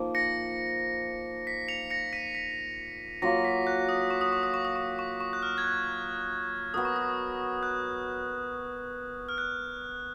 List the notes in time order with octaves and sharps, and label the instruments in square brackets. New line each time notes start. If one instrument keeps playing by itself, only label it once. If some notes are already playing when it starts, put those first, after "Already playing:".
Already playing: [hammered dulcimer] F3 A#3 D#4
[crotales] A#6 C#7
B6
C#7 F7
A#6 C#7
B6 D#7
B6
[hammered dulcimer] F#3 A#3 F4 [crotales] A#6
[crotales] B6
F#6
D#6
C#6
D#6
C#6
D#6
C#6
D#6
C#6
C#6
C#6
F#6
F6
G#6
F#6
[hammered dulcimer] B3 F#4 A#4 [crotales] D#6
[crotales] C#6
D#6
F#6
F6
F#6